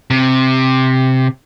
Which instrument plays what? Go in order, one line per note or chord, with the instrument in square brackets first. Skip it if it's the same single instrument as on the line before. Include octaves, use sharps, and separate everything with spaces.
[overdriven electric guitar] C3